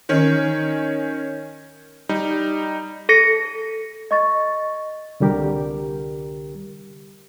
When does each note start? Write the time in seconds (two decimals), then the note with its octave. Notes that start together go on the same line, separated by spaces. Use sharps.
0.09 D#3 C#4
2.09 G3 D#4
3.09 A4 A#6 C#7
4.11 D#5 C#6 A6
5.20 C2 D3 G3 G4 A#4